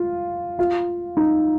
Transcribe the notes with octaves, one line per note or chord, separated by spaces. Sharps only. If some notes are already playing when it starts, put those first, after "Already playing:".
Already playing: F4
F4
D#4